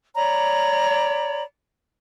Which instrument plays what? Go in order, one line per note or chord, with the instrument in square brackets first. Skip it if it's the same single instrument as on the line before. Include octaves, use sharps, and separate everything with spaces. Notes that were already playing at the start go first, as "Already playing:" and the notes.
[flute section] C#5 D5 A#5 B5